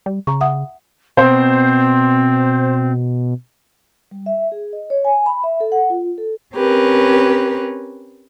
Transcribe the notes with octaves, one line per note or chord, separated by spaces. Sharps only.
G3
C#3 A#5 C#6
E5 F#5 D#6
B2 C4 C5
G3
E5
G#4
D#5
C#5
G#5
B5
E5
A4
F#5
F4
A4
C4 C#4 G4 A#4 B4